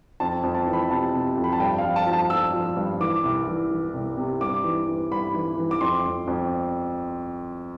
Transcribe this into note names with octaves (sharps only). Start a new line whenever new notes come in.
F2 A5
F2
A5
E3
B5
C3 A5
C3
F2
B5
A5
G2 G5
F5
F3
A5
F3
A5
F3 E6
F3
G2
E3 D6
C2
E3
E3
C2
C3
G2 D6
E3
E3
G2 B5
E3
E3
D6
F2 C6
F2
F2